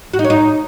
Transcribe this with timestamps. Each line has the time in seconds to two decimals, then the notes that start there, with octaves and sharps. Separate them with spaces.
0.14 F#4
0.19 D#4
0.24 C#5
0.30 D#4